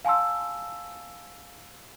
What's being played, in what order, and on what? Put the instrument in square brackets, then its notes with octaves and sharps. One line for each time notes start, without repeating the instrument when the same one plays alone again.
[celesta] F5 G#5 A5 C6 E6